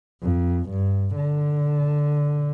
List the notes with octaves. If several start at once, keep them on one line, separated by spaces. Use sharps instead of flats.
F2
G2
D3